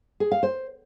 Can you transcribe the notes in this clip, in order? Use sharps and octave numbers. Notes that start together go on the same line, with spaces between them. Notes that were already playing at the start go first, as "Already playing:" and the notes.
G#4
F5
C5